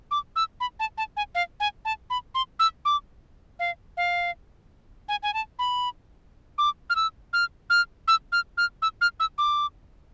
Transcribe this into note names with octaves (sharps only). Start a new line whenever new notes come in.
D6
E6
B5
A5
A5
G#5
F5
G#5
A5
B5
C6
E6
D6
F5
F5
G#5
G#5
A5
B5
D6
F6
E6
F6
F6
E6
F6
F6
E6
F6
E6
D6